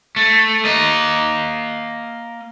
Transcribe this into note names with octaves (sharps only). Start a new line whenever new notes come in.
A3
A#3 D#5